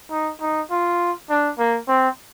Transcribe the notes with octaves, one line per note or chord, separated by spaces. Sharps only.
D#4
D#4
F4
D4
A#3
C4